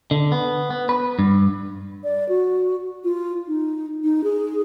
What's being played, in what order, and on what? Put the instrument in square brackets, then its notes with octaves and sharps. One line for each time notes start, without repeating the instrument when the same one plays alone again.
[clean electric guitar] D3
B3
B3
B4
G2
[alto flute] D5
F#4
F4
D#4
D#4
G#4